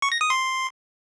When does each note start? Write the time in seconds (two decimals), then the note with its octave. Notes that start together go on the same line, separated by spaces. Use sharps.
0.02 C#6
0.12 A#6
0.21 D#6
0.30 C6